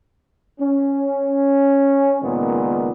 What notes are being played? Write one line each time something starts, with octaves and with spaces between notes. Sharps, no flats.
C#4
C#2 A#2 D#3 G#3 B3